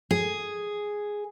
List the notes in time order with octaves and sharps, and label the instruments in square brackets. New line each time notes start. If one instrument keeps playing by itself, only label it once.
[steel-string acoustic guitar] G#4